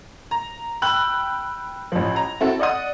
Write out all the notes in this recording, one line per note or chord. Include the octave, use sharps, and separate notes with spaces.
A#5
G5 B5 E6 F#6 F#7
A1 F3
A#5
C4 E4 F#4 A4
D5 D#5 F#5 D#6